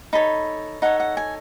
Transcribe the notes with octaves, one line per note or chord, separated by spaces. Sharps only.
D#4 A4 C#5 B5
D#4 A4 C#5 F#5
F#5
G#5